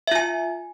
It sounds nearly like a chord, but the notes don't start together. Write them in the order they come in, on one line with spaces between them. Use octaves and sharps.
E5 F4 G#5